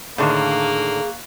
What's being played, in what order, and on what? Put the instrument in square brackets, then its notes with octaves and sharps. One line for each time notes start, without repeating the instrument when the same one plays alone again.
[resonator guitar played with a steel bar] A2 D3 D#3 [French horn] A#3 [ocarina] G#4 [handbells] F5 C#6 F#6